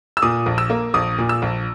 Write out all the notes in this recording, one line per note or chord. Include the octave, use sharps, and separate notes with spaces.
E6
A#2 D#6
A#1
E6
A#3
A#1 D#6
A#2
E6
A#1